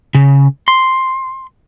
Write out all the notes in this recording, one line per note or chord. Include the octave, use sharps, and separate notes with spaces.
C#3
C6